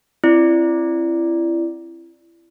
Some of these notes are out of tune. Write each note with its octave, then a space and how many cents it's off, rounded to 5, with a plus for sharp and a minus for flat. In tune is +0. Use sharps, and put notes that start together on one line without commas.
C4 +25 E4 +30 D5 +0